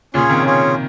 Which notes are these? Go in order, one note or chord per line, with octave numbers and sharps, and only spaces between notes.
A#2 C#3 C#4 F4 G#4 C#5
C3 D#3
C#4 F4 G#4 C#5